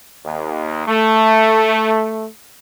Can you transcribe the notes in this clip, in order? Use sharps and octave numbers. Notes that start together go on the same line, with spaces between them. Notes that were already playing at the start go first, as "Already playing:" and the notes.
D#2
A3